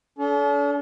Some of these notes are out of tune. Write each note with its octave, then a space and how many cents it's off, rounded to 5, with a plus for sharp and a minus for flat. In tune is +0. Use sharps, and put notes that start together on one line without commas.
D4 -45 A4 -30